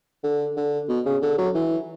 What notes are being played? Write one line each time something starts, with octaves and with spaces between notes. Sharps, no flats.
D3
D3
B2
C#3
D3
F#3
E3